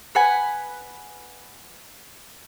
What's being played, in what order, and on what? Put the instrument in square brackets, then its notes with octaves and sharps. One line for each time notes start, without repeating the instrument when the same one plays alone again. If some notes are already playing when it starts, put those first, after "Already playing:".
[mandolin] B4 F#5 G#5